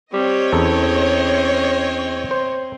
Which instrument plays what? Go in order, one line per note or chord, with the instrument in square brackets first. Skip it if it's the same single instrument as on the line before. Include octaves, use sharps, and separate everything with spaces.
[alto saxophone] G3 [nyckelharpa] C4 [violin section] C#5 D#5
[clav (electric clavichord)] E2 A4 A#5 [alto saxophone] C#4
[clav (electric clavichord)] C5